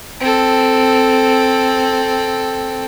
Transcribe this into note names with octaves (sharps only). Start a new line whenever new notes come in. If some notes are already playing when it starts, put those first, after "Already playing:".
C4 A4